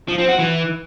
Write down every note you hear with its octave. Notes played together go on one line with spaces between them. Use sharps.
F3
C4
F#4
E3